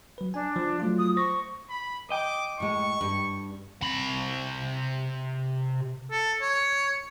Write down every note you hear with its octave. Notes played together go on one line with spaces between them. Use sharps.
F#3 B4
D4 G#5
F3
F#3 A3 F4
D#6
C5 C#6 A#6
B5
D#5 G5 D6
A2 G#3 C#6
G2
C3 B5
A4
C#5